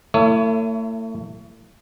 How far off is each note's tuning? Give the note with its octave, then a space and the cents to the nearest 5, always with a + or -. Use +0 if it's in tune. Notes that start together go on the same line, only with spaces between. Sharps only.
A3 +40 E4 +15 C#5 +25